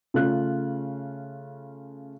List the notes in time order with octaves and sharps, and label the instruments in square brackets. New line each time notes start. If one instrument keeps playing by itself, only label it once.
[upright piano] C#3 A3 F4 F#6